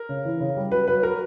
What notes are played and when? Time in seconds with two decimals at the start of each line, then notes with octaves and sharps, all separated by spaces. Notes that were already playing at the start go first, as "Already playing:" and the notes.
Already playing: A#4
0.09 C#3
0.25 E3
0.40 C#3
0.56 G3
0.71 F#3 B4
0.87 F#3 B4
1.03 F#3 A#4